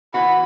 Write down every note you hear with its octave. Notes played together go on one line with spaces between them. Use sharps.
E3 B3 F#4 B5